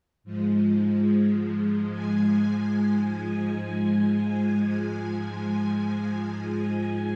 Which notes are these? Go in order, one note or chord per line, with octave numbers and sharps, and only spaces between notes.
G#2 F3 G#3
G#5